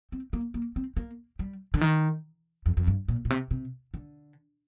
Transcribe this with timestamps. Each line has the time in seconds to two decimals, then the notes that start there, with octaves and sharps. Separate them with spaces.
0.12 C4
0.33 A#3
0.54 A#3
0.76 C4
0.97 A#3
1.39 G3
1.74 D3
1.81 D#3
2.66 F2
2.77 F2
2.87 G2
3.08 A#2
3.25 A#2
3.30 C3
3.51 C3
3.94 D3